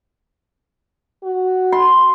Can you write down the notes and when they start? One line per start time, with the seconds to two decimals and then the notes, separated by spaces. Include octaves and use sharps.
1.23 F#4
1.72 C6